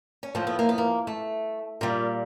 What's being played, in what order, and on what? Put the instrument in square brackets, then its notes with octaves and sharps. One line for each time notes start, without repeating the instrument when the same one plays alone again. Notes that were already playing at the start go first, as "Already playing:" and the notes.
[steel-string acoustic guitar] C#4
A2 F3 A3 C4
B3
A#3
B3
A#3
A3
A#2 G3 A#3